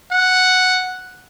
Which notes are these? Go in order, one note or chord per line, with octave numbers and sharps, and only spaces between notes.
F#5